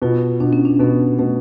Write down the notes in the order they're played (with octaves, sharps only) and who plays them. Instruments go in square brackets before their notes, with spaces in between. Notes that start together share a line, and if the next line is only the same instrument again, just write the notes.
[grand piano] B2 [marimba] F4
[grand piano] B2 [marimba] D4
[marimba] C#4
D4
[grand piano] B2 [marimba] B3
[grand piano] B2 [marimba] A3